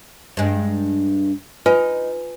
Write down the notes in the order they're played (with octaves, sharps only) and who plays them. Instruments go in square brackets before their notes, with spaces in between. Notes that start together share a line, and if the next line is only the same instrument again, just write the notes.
[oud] G2 G#3
[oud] D#4 [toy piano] F4 B4 G#5